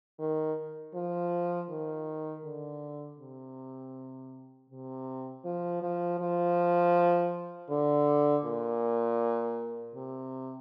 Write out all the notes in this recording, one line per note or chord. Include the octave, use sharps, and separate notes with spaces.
D#3
F3
D#3
D3
C3
C3
F3
F3
F3
D3
A#2
C3